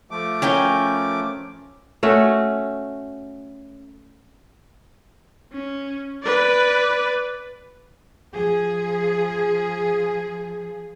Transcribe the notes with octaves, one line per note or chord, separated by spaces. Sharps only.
F3 A3 D6
C#4 A#4 G5
A3 C#4 F#4
C#4
B4 D5
F3 G#4